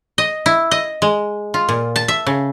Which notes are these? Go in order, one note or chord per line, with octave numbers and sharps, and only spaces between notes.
D#5
E4
D#5
G#3
F4
A#2
A5
E5
C#3